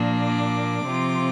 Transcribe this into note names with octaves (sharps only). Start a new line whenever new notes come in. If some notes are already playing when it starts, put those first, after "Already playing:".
Already playing: A#2 F3 A#3 D4
D6
C3 F3 C4 F4